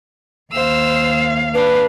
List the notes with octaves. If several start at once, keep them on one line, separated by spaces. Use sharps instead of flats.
D#2 C5 F5 E6
D4 B4